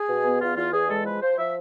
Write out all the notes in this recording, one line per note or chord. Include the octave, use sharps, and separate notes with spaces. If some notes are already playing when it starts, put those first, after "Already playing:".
Already playing: G#4
B2
B3
E2 F4
E2 F4
E2 G#4
G#3 A4
F3 B4
F3 C5
F3 E5